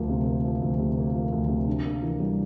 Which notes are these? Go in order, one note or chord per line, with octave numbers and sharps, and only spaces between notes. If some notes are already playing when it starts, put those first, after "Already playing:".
Already playing: D2 F3 A#3
C3
A#3
F3
D2
C3
A#3
F3
D2
C3
D4
A#3
E3
G3